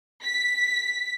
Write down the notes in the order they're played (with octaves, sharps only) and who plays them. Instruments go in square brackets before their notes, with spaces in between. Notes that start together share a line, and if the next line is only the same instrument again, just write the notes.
[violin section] B6